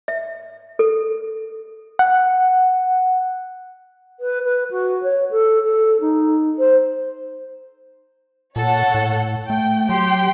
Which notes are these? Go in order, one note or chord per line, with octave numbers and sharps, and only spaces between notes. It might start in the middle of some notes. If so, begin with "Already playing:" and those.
E5
A4
F#5
B4
B4
F#4
C#5
A4
A4
D#4
C5
A#2 A4 C#5 F#5
A2
A3 G5
F#3 G4 G5 C6